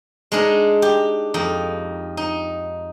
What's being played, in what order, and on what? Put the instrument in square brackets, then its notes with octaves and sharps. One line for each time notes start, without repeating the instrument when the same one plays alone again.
[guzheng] G#3 D4 D#4 A#4
G4
F2 D#4
D#4